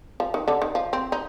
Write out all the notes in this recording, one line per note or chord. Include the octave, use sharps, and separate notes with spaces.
F3
D#3
D3
D#3
F3
C4
D#4